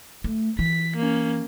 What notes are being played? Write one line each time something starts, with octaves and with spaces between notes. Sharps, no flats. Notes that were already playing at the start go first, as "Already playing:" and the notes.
A3
E3 B6
A#3 C#4